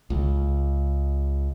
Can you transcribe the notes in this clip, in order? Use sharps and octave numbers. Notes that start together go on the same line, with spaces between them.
C#2